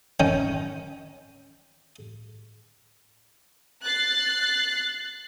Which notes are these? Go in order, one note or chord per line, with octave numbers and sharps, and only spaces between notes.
D#3 C#4 G5
F#6 A6 C7